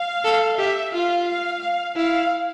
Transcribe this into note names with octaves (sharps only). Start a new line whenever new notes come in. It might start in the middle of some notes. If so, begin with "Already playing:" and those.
Already playing: F5
A4
G4 E5
F4 F5
F5
F5
E4 F5